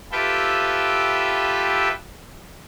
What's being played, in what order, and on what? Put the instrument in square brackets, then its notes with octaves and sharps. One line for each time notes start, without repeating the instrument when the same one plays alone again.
[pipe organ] F4 G4 A4 B4 E5 G5